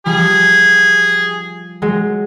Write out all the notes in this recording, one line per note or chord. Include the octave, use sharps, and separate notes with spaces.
F3 G3 G#4
F#3 G#3